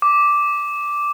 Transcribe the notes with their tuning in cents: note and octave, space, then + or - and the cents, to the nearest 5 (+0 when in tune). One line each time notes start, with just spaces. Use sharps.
D6 -5